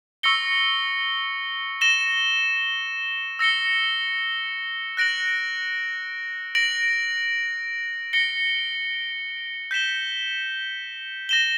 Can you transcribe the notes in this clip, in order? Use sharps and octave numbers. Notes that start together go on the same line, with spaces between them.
C#6 E6 A#6 C#7 G7
A#6 E7 G7
E6 A#6 C#7 G7
F#6 A#6 D7 F#7
A#6 D7 F#7
A#6 C#7 G7
G6 B6 E7 G7
A#6 E7 G7